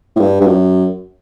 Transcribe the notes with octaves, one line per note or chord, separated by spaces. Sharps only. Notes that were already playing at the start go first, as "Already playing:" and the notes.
A2
G2
G2
F#2